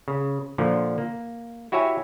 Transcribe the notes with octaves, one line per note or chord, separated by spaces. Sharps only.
C#3
A#2 D3 F3
A#3
E4 F#4 G4 C#5 E5 G#5